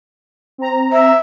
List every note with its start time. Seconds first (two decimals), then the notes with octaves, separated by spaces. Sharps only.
0.58 C4 A#5
0.93 E5